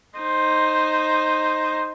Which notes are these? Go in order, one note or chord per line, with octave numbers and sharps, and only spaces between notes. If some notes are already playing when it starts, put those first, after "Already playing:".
D#4 C5